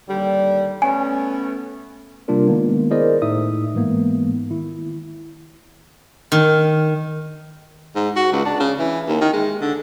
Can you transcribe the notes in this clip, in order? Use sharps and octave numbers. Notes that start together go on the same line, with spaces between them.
D#2 D3 G3
A3 B3 C#4 G#5
C3 G3 A#3 D4 F4 A#4
D#3 G#3 A#3 B3
E4 G#4 A#4 C5 D5 D#5
A2 D#4 E5 D#6
G#2 E3 G#3 A#3 B3
D#3 E4
D#3
G#2
F#4
C#2
D4
C#3
E3
D#2
D#3
G#3
D3